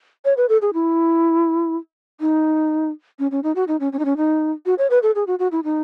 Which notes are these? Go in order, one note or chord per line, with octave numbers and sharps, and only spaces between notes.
C#5
B4
A4
G#4
E4
D#4
C#4
C#4
D#4
F#4
D#4
C#4
C#4
D#4
C#4
D#4
F#4
C#5
B4
A4
G#4
F#4
F#4
E4
D#4